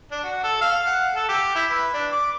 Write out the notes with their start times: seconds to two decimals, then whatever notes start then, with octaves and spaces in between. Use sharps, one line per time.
0.11 D4
0.24 F#4
0.44 A4
0.61 F5
0.86 F#5
1.15 A4
1.29 G4
1.55 E4
1.71 B4
1.94 D4
2.12 D6